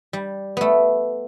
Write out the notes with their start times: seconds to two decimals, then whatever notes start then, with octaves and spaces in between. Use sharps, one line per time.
0.13 G3
0.57 A3 B3